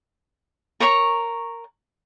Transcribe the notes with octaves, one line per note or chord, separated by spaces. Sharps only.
A#4 C#5 A#5 C#6